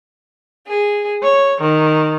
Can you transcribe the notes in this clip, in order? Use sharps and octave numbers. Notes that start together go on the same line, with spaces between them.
G#4
C#5
D#3